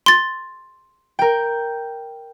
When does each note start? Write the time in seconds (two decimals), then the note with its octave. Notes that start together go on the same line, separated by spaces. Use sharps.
0.06 C6 A6
1.19 A#4 G5